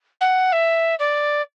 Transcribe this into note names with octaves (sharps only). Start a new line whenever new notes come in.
F#5
E5
D5